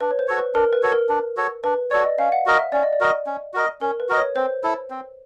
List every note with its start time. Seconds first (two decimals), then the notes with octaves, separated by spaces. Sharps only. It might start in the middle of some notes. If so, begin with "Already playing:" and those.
0.01 D4 B4
0.11 C#5
0.19 C5
0.28 F#4 A4 C#5
0.37 B4
0.55 D4 A#4
0.73 B4
0.83 F#4 A4 C#5
0.92 A#4
1.09 D4
1.37 F#4 A4 C#5
1.64 D4 B4
1.91 F#4 A4 C#5 D5
2.05 D#5
2.19 C#4 F5
2.32 F#5
2.46 F#4 A#4 D#5
2.59 E5
2.72 C#4 D5
2.83 D#5
2.93 D5
3.00 F#4 A#4 D#5
3.26 C#4
3.54 F#4 A#4 D#5
3.81 C#4 A#4
4.00 B4
4.09 F#4 A#4 D#5
4.17 C#5
4.36 C4 C5
4.64 E4 A4
4.90 C4